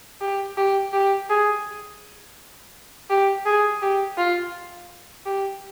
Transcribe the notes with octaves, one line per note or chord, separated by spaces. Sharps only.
G4
G4
G4
G#4
G4
G#4
G4
F4
G4